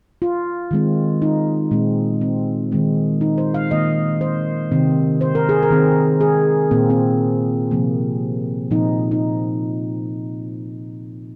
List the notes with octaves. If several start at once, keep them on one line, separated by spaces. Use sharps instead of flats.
F4
D#3 G#3 C4
D#4
A#2 G#3 C4
C4
D#3 G#3 C4
D#4
C5
F5
D#3 A#3 D#5
C5
C3 D#3 C4
C5
A#4
G#4
A#4
D#3 C4
G#4
A#2 A#3 C4
C4
C3 F3 A#3
A#2 F3 C4 D#4
D#4